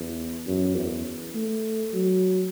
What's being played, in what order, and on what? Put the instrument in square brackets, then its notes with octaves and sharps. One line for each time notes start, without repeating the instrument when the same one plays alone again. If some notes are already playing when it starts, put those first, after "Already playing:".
Already playing: [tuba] E2
F#2
E2
A3
F#3